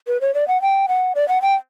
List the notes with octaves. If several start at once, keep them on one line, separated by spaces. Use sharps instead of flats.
B4
C#5
D5
F#5
G5
F#5
D5
F#5
G5